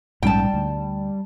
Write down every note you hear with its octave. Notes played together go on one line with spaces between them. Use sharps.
A#1 G#2 G3 C#4 G5 A5
D2